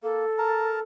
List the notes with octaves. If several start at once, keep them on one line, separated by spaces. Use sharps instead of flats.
A#3 A4
A#4 A5 A#5